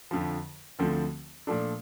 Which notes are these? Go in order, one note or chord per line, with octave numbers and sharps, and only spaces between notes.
F2 D3 F3
D2 D3 F3 A3 C4
A#2 F3 A3 D4 A4